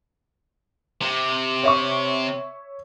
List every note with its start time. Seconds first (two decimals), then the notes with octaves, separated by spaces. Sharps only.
1.01 C3
1.63 C#5 E5 C#6